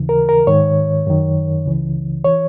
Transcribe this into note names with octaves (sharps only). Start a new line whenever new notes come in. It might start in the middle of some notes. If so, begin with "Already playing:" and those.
Already playing: D#2 C#3 E3
A#4
A#4
G#2 D#3 C#5
F#2 D#3
C#2 C#3 E3
E3 C#5